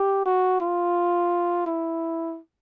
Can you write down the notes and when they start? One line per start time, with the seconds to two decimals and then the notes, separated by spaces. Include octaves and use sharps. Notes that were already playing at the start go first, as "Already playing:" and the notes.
Already playing: G4
0.26 F#4
0.60 F4
1.66 E4